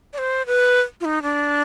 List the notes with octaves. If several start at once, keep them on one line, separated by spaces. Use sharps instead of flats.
D5
C5
B4
F4
D#4
D4